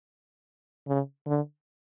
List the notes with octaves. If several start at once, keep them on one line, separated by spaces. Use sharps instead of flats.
C#3
D3